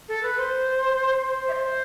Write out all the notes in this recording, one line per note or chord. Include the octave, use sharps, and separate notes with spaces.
A4
B4
C5
C5
E5
C5